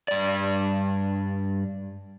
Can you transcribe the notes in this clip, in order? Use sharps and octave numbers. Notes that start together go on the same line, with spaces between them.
G2 D5